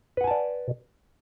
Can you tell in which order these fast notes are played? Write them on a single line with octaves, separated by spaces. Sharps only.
B4 F#5 G#5 A5 D5